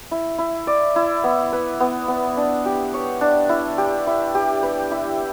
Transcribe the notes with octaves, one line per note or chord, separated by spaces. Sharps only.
E4
E4
D5
E4
B3
B4
B3
B3
D4
G4
C#5
D4
E4
G4
E4
G4
B4
E4